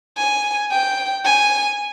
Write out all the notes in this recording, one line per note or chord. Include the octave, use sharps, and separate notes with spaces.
G#5
G5
G#5